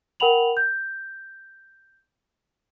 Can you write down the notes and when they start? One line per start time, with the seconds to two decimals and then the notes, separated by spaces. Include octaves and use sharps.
0.20 A#4 F#5 G5 B5 F7 F#7
0.57 G6